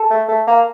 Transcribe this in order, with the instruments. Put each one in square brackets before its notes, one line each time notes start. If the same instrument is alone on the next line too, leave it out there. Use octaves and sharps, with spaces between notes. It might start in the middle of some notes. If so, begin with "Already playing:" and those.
Already playing: [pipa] A4
[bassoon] A3
A3
A#3